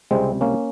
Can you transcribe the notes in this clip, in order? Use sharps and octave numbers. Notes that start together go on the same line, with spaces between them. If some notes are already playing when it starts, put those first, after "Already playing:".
C#2 C3 G3 G#3 C4
A#3 C#4